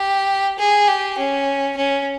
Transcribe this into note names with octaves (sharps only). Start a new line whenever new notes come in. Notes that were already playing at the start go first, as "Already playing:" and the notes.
Already playing: G4
G#4
G4
C#4
C#4